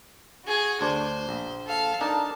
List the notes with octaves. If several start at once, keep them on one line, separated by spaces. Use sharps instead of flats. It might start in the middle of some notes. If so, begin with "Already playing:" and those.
F#4 G#4
D2 D4 C5
A#1
A4 F5
D4 D#4 A#4 A5